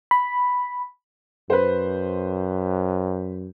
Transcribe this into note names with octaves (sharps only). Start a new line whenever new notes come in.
B5
F#2 B4 C5